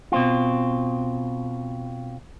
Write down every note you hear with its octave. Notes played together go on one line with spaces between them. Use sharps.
B2 C4 F4